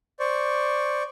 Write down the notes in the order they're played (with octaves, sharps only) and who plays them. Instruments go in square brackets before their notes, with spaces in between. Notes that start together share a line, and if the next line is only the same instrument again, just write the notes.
[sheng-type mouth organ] C5 D5 C#6